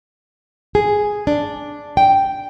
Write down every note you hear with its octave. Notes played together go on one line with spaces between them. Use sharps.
G#4
D4
G5